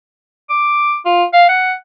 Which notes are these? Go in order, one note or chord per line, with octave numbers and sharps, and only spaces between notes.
D6
F4
F5
F#5